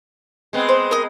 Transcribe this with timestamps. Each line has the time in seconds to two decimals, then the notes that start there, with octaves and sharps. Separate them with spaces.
0.53 G#3 B3 C4
0.69 C5
0.91 A#4 D#5